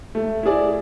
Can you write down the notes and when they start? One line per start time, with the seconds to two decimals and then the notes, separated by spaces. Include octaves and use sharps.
0.15 A3
0.43 E4 G#4 D5